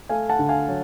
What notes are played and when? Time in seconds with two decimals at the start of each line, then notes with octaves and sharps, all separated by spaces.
0.09 A3 F5 G#5
0.30 F#5 A5
0.39 D3
0.49 F5 G#5
0.68 F#3